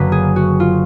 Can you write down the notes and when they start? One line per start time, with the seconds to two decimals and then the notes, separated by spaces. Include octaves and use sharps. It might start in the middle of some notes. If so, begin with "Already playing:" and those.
Already playing: F#1 F#2 D3 F#3 A#3 B4
0.12 G#4
0.36 F#4
0.60 F4